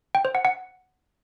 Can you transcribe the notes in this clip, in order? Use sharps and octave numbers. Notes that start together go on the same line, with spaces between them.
G5
C5
F#5
F#5